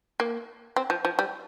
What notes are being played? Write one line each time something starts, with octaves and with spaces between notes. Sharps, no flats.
A#3
C4
F3
F3
G3